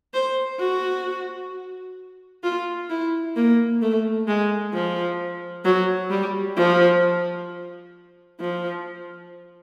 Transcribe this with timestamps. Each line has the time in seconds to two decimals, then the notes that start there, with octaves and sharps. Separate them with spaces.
0.14 C5
0.60 F#4
2.43 F4
2.90 E4
3.36 A#3
3.82 A3
4.28 G#3
4.74 F3
5.65 F#3
6.11 G3
6.57 F3
8.41 F3